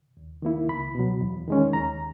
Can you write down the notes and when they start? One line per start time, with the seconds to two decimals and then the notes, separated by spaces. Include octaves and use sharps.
0.17 D#2
0.42 D#3 A#3 E4
0.68 C#2 B5
0.95 B2 F#3
1.21 E2
1.48 D#3 G#3 C#4
1.73 D#2 A#5